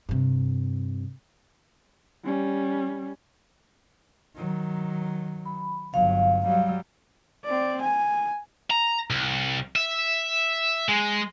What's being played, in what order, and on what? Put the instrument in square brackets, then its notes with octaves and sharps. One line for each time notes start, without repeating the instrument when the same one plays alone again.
[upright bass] G2 C3
[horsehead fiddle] G3 C#4
[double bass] D#3 F#3
[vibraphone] B5
[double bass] G1 F#3 [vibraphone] F5
[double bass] F#3 G3
[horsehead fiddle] C4 D5
G#5
[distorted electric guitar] A#5
C2
E5
G#3